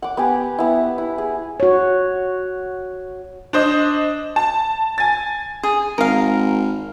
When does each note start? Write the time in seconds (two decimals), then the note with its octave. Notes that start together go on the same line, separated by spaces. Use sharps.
0.02 F#5 D6
0.17 B3 G4 G#5
0.58 B3 E4
0.98 E4
1.18 G#4
1.60 F#4 C#5
3.53 D4 C5 D#5
4.36 A5
4.98 G#5 A6
5.63 G#4
5.98 G#1 A#4 F5